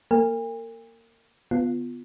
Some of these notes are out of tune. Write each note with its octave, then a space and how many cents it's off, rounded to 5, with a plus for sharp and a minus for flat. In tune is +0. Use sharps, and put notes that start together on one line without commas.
A#3 +0 A#4 -35 G#5 -45
D3 -5 B3 +0 F4 +0